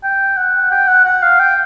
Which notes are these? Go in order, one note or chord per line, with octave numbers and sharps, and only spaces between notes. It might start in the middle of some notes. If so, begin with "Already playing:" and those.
G5
F#5
G5
F#5
F#5
F5
G5